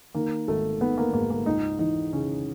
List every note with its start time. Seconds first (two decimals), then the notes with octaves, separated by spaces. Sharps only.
0.15 D#3 A#3
0.48 G#1 A3
0.81 D#3 B3
0.98 A#3
1.13 G#2 A#3
1.30 A#3
1.46 C#2 D#4
1.79 E3 D#4
2.13 C#3 C#4